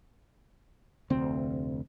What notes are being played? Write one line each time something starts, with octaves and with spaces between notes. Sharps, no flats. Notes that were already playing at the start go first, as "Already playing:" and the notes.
F1 D2 C4